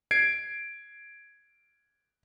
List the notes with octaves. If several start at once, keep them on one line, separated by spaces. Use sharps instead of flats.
G#6 C7 D7